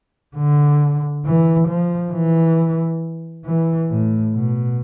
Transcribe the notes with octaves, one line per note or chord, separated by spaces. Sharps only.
D3
E3
F3
E3
E3
A2
B2